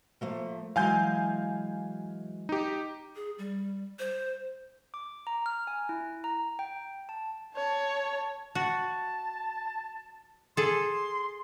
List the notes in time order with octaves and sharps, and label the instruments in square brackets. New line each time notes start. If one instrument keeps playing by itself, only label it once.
[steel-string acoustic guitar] F3 A3 A#3
[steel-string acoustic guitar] E3 F#3 G#3 [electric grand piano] F5 G#5 G6
[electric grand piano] D#4 G4
[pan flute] G#4
G3
C5
[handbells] D6
A#5
F6
G#5
E4
A#5
G5
A5
[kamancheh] C#5 A5
[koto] F#4 [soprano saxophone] A5
[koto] G#4 A4 [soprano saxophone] C6